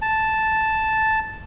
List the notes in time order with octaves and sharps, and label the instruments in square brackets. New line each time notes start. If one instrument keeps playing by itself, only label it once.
[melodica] A5